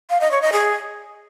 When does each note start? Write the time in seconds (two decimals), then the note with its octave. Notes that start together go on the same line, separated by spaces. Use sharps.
0.10 F5
0.21 D#5
0.31 C#5
0.42 D#5
0.52 G#4